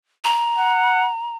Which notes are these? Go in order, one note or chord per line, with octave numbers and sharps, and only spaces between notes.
A#5
F#5